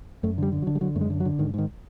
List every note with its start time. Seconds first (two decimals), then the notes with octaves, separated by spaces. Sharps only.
0.23 F#2 A3
0.38 D3 G3
0.52 D3
0.62 F#3
0.67 D3
0.75 G3
0.81 D3 F#3
0.95 F#2 A3
1.01 G#3
1.10 D3
1.20 F#3
1.25 D3
1.39 G#2 D#3
1.54 G#2 D#3